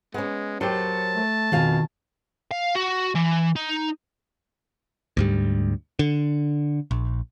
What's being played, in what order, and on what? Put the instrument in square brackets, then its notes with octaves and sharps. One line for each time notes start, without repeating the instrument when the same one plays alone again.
[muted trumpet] G#3 [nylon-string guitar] B3 C#4
[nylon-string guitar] F#3 G4 [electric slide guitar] A#4 C5 C#5 [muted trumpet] A5
[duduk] A3
[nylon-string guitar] F2 F5 G#5 [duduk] B2 [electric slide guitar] D#3
[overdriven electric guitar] F5
F#4
E3
D#4
[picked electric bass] D2 G#2 G3
D3
A#1